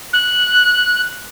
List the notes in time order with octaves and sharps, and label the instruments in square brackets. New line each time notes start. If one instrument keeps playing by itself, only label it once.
[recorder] F#6